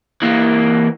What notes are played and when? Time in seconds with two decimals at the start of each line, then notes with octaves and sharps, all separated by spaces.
0.22 E3 A#3